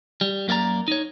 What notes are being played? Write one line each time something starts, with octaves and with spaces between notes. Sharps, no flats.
G3
F#2 A#3 F4 D5 A#5
D#4 C#5